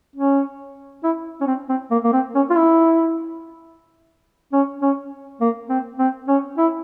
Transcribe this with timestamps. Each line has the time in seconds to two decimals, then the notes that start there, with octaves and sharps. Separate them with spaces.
0.15 C#4
1.04 E4
1.41 C#4
1.47 C4
1.69 C4
1.91 A#3
2.04 A#3
2.13 C4
2.35 C#4
2.50 F4
2.56 E4
4.52 C#4
4.82 C#4
5.41 A#3
5.69 C4
5.99 C4
6.28 C#4
6.57 E4